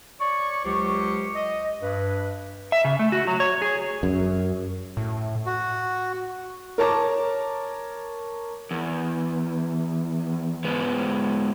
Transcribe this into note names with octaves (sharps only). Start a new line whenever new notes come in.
C#5 D5 C#6
C#2 F#3 G4 C5 C#6
D#5
G2 B4
E5
C#3
A3
F#4
F#3
C#5
G#4
F#2
A2
F#4
A#4 C#5 A5 A#5 D6
E2
G#2 G#3 B3